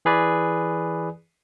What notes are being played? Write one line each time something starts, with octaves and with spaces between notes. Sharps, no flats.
E3 G#4 B4 D5